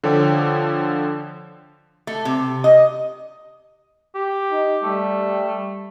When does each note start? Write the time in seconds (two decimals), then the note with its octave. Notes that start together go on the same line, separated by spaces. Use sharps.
0.03 D3 F3 A4 C#5 G5 D6
2.07 A3
2.25 C3
2.64 D#5
4.15 G4
4.52 D#4
4.83 G3 A3